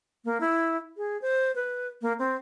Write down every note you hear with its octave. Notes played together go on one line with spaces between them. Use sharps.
A#3
E4
G#4
C5
B4
A#3
C4